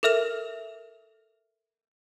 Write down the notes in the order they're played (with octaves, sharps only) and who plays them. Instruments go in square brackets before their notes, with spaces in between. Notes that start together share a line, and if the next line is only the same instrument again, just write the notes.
[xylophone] A4 A#4 E5 F6 F7